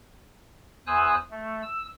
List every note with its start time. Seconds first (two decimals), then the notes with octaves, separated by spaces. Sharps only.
0.87 E2 C5 G#5 D#6 E6 F#6
1.31 A3
1.62 E6